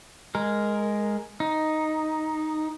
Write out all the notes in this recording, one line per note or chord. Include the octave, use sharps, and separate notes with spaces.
G#3 A#4
D#4